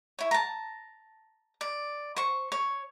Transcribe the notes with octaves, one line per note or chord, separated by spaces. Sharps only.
E4 C#5
A5 A#5
D5
C5 C#6
C#5